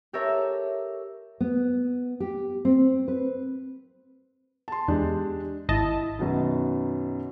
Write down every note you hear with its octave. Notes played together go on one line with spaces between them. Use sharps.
G4 A4 A#4 C#5 E5
B3
G4
C4
B4
A5 C6
E2 G#3 D4 G4
G#1 E4 D#5 A5
F#2 B2 D#3